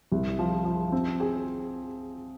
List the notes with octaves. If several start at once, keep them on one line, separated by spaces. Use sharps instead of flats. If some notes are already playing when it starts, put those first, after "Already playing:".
C2
F3
F3
C4
G#4